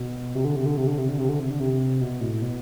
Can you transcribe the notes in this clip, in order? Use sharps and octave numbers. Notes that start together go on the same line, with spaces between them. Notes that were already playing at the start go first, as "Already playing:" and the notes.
Already playing: B2
C3
D3
C3
D3
C3
D3
C3
D3
C3
D3
C3
D3
C3
B2
A2
B2